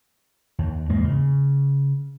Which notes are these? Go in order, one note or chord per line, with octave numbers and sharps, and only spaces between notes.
D#2
E2 G#2 G#3 A#3
C#3